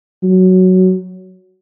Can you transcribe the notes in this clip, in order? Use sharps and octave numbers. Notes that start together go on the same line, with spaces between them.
F#3